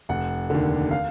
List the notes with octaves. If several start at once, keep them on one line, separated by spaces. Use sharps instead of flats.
F1 F#5
D#2 D3
F5